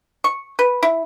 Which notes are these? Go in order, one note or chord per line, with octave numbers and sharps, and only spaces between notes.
C#6
B4
E4